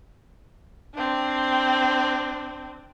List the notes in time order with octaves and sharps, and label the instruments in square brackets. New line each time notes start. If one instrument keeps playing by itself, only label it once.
[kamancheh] C4 D4